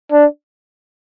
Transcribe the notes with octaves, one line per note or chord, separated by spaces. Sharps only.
D4